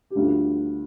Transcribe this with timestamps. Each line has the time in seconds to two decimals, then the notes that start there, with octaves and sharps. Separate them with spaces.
0.10 G4
0.15 D2 D3 G3 D4 F4